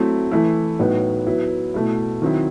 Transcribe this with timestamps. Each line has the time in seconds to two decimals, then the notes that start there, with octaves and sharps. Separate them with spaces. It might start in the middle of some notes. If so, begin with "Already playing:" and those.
Already playing: F#3 A3 C4 E4
0.31 E3 A3 E4
0.79 A2 F#3 B3 D#4
1.27 F#3 B3 E4
1.74 B2 A3 E4
2.22 D#3 F#3 C4 E4